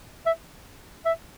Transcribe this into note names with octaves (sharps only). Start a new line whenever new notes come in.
E5
E5